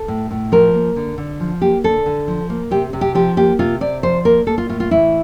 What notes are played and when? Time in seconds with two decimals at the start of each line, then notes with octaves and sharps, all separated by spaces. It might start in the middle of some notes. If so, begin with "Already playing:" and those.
Already playing: A4
0.08 A2
0.31 A2
0.52 F3 A#4
0.74 A#3
0.96 D3
1.18 D3
1.40 F3
1.62 A#3 G4
1.84 D3 A4
2.06 D3
2.28 F3
2.50 A#3
2.71 C3 G4
2.93 C3
3.01 G4
3.15 F3 G4
3.37 A#3 G4
3.59 C3 F4
3.81 C3 D5
4.03 F3 C5
4.25 A#3 A#4
4.47 A#3 A4
4.58 F4
4.69 A2 F4
4.80 F4
4.91 E3 E4